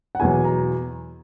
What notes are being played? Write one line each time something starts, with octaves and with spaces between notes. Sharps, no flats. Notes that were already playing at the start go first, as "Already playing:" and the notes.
F#5
E2 B2 F#3 G#5
A#5